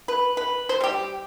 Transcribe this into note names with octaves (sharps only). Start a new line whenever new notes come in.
B4
B4
C5
G3 G4